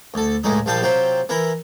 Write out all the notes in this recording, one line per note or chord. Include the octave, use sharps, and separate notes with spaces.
D2 A4
C#2 A2 G#3 D#4 D#6
A#1 F3 G3 F5 G5 A5
C3 F#3 F4 C5 G5
E3 E4 A#4